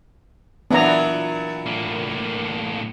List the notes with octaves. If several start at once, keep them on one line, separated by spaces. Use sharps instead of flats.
A#2 E3 F#3 B3 D4 E4 E5 A#5
A2 A#3